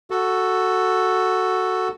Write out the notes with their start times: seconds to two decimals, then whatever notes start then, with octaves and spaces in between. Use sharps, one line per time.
0.11 F#4 A4